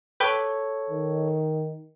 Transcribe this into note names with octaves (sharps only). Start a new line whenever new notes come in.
A4 B4 C#5 G5 D6
D#3